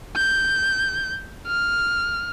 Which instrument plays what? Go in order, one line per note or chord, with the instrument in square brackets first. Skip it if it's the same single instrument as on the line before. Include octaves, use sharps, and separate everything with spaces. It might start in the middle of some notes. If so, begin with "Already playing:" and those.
[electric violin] G6
F6